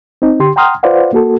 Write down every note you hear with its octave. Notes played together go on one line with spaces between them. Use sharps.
C4 D#4
D3 G4 C6
F#5 G5 A#5 C6 D#6 F6
F4 B4 C5 D5 F5 F#5
A#3 F#4 A4